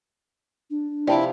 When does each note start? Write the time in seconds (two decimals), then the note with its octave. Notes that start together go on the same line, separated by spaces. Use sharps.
0.70 D4
1.07 C3 F3 E4 D5 G5 A5 D6